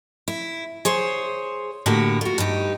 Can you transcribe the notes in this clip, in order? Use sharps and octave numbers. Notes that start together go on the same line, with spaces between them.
E4
G#4 C5 C#5
A2 D3 A#3 F#4 G4
F4 F#4
G2 D#4 G4